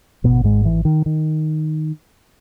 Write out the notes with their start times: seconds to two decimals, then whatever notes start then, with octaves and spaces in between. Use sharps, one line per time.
0.24 G#1 G#2 B2 B3
0.44 G#2 G#3
0.65 E3
0.85 D#3
1.06 D#3